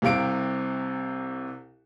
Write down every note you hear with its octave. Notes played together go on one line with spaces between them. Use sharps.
C2 C3 F5 D7